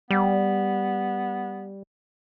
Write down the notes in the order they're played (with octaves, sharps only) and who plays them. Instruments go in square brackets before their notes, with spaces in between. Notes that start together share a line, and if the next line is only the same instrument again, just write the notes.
[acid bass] G3 [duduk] B3